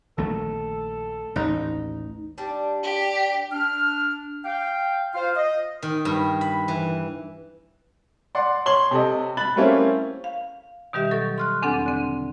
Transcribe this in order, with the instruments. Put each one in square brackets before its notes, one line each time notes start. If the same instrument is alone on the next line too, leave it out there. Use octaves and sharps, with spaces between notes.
[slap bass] A#1 D#3 A3 [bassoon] A4
[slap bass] A1 D#2 [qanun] D#4
[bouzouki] G3 D4
[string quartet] G4
[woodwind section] D4 F6
F5 G5
F4 C5 F5
D#5
[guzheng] D#3
G2
B5
E3
[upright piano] D5 F#5 C6
C#5 C6 F#7 G7
C3 A4 D#5
B5 F#6 A6 F#7
G3 A3 A#3 C4 C#4 E4
[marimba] F5
B2 D#3 G3 G4 E5
F#3 A4 C#6
C6 F6 F#6
E2 C4 D4 A4 F#5
D3 C4